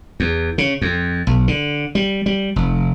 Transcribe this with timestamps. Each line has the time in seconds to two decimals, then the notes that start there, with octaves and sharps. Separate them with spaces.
0.20 E2
0.58 C#3
0.82 F2
1.27 B1
1.48 D3
1.95 G3
2.26 G3
2.56 F1